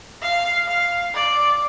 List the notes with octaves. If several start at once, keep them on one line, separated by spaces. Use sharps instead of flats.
F5
F5
D5